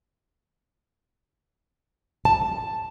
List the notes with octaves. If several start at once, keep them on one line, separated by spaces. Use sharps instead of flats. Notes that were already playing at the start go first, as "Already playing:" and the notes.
A5